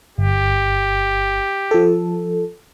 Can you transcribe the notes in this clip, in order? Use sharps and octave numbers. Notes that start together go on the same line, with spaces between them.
G1 G4
F3 A4